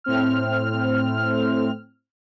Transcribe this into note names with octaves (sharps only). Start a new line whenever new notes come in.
A2 C4 F6